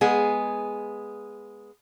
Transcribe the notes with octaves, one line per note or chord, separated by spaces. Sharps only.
G#3 B3 G#4